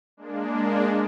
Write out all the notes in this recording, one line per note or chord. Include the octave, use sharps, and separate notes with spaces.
G#3 A#3 D4